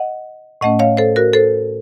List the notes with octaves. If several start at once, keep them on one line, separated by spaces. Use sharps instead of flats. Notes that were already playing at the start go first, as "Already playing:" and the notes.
Already playing: D#5 F#5
A2 A3 C#4 D#5 F#5
C#5 F5
A4 C5
F#4 A#4
A4 C5